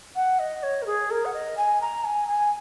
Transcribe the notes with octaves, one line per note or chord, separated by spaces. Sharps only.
F#5
D#5
C#5
A#4
G#4
A#4
F#5
D#5
G#5
A#5
G#5
G#5